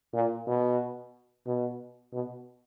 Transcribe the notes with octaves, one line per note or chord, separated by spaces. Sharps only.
A#2
B2
B2
B2